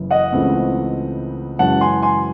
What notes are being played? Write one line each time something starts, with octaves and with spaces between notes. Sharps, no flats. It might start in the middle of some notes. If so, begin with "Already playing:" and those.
Already playing: F#1 F#2 C#3 E3
D#5 F#5
C#2 C#3 E3 A3 C4
F#2 C#3 E3 G#3 C#4 F#5 A5
G#5 C6
G#5 C6